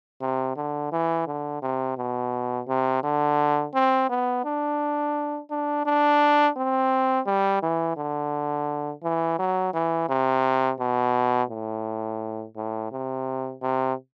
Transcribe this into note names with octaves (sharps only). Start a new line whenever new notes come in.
C3
D3
E3
D3
C3
B2
C3
D3
C4
B3
D4
D4
D4
C4
G3
E3
D3
E3
F#3
E3
C3
B2
A2
A2
C3
C3